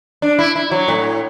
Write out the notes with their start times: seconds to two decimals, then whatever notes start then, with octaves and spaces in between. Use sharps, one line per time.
0.22 D4
0.39 E4
0.56 E4
0.71 F#3
0.88 A2